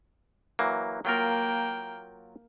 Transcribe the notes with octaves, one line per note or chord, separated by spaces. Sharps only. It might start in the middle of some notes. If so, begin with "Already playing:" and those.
E3 F#3 A#3
F#3 A#3 F4 A#4 G5